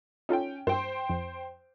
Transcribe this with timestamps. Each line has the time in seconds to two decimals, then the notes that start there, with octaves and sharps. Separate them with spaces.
0.29 C#4 D#4 F4 A4 G5
0.67 G2 C5 G5 C6
1.10 F2